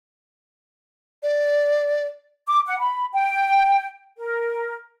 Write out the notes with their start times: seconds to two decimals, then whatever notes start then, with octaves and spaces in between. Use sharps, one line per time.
1.23 D5
2.47 D6
2.67 F#5
2.80 B5
3.13 G5
4.18 A#4